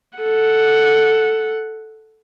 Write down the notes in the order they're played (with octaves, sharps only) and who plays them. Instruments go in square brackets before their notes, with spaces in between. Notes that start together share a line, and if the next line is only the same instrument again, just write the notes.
[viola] A4 F#5